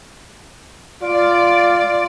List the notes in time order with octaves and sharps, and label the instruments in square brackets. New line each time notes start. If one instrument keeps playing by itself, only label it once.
[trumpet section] F4 [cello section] D5